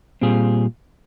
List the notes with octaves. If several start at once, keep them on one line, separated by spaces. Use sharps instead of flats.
A#2 G3 C4 F4 G#4